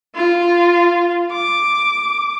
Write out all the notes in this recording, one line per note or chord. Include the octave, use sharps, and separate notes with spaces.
F4
D6